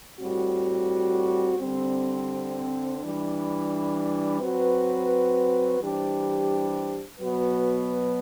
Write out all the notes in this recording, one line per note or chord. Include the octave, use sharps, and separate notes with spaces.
A2 G3 C4 F#4
D3 G3 C4
E3 G3 D4
F#3 C4 F#4 B4
E3 G3 D4 G4 C5
B2 F#3 B3 F#4 B4